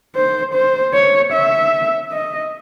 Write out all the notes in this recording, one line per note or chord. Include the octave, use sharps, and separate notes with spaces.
C5
C5
C#5
E5
D#5